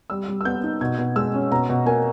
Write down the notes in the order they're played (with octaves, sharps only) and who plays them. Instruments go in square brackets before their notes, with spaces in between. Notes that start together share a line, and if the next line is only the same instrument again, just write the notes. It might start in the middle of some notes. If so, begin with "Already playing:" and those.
[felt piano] G3 E6
G3
E6
B3 G6
D#4
B2 G#6
B2
G#3 E6
C#4
B2 A#5
B2
A#3 G#5